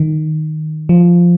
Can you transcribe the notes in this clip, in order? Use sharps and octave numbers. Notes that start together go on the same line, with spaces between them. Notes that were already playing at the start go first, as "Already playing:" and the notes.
Already playing: D#3
F3